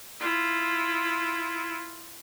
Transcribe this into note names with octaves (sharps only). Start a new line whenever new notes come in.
E4 F4